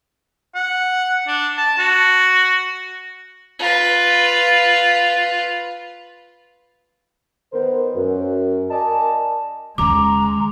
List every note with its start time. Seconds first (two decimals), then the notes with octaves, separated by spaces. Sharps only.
0.55 F#5
1.27 D4
1.57 A5
1.78 F#4
3.59 F4 B4
7.53 D#3 B3 A#4 C5
7.96 F#2
8.71 A#4 D5 D#5 G#5 A5
9.78 D#2 C#3 G#3 A#5 D6